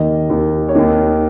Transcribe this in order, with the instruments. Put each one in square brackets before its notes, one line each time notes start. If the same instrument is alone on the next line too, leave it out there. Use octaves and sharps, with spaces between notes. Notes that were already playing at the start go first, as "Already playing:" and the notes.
Already playing: [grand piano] D#2 D#3 D#5
D#2 D#3
C#5
D#2 D#3 D#5